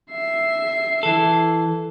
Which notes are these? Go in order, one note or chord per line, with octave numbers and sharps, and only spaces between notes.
E5 C7
E3 A4